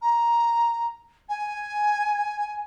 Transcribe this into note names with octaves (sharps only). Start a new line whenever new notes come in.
A#5
G#5